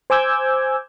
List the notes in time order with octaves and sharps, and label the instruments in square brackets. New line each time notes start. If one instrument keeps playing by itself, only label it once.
[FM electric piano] C5 G#5 D6 E6 G6 G#6